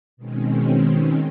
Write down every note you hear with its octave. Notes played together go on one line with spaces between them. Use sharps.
B2 D#3 G#3 C4 C#4